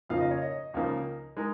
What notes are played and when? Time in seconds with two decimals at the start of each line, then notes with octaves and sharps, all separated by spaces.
0.09 F2 C#3 A#3 D#4 F4 F5
0.20 D#5
0.31 C#5
0.42 D#5
0.74 C#2 C#3 F3 A#3 D#4
1.37 G#3 D#4 A#4